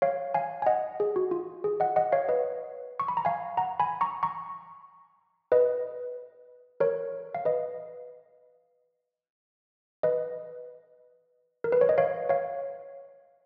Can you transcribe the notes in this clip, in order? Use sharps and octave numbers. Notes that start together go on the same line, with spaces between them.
C#5 F5
F5 G#5
G#5
D#5 F#5
G#4
F#4
F4
G#4
D#5 F#5
D#5 F#5
C#5 F5
B4 D#5
C#6
B5
A#5
F5 G#5
F#5 A#5
G#5 B5
A#5 C#6
A#5 C#6
B4 D#5
A#4 C#5
F5
B4 D#5
B4 D#5
A#4
B4
C#5
D#5
C#5 F5
C#5 F5